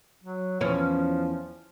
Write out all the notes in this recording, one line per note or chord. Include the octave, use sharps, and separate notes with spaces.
F#3
E2 F3 C#4